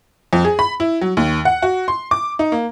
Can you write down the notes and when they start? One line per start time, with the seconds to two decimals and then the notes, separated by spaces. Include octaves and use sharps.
0.33 F2
0.45 G#4
0.59 B5
0.80 E4
1.01 F#3
1.17 D#2
1.45 F#5
1.62 F#4
1.88 C6
2.11 D6
2.39 D#4
2.52 A#3